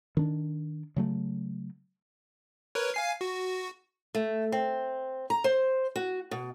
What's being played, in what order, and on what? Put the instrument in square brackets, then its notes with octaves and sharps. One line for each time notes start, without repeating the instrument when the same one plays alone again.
[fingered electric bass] D#3 D4
C#3 F#3 A3
[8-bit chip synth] A#4 B4 C#5
F5 G#5 C7
F#4
[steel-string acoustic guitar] A3
C4
A#5
C5
F#4
B2